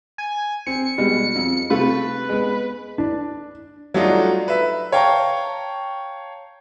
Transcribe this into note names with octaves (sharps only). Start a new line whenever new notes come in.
G#5
C4 C#7
B2 G3 G#3
F2
C3 A3 F4 B4
G#3 B3
D4
F#3 G3 A3 D4 D#4 F4
B4 E5
C#5 F5 G5 A5 A#5 C#6